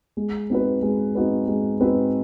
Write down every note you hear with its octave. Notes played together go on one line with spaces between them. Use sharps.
G#3
C4 D#4 F#4 B4
G#3
C4 D#4 F#4 B4
G#3
C4 D#4 F#4 B4